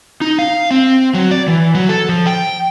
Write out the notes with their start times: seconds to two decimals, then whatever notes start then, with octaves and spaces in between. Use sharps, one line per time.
0.21 D#4
0.39 F5
0.71 C4
1.14 F#3
1.31 D5
1.48 E3
1.75 F#3
1.89 A4
2.09 F3
2.27 G5